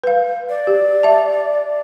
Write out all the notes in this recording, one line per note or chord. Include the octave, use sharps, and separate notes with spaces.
B4 F5
D5
G4
E5 A5